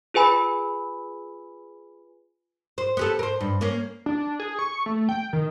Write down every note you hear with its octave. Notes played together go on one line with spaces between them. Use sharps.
F4 G#4 B4 G#5 B5
C5
B3 G4 A4
A#4 C5
G2
A#3 C#4
D4
G#4
C#6
A3
G5
D#3